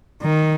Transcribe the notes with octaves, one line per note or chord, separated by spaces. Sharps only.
D#3